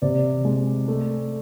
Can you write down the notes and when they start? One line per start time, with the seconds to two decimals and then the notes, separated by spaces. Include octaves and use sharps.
0.02 C3 D5
0.45 G#3
0.88 A3